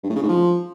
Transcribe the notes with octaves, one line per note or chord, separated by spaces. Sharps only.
G2
A2
C#3
G#2
F3